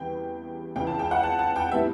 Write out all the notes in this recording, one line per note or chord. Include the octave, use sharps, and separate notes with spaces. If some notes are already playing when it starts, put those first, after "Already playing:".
Already playing: E2 C#3 E3 G3 B3 G5
C#2 C#3 E3 G5
A5
G5
F#5
A5
A5
G5
A2 G3 B3 E5